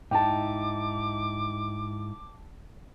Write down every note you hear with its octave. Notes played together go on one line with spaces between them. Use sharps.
G#2 D#4 E4 G5 A5 D6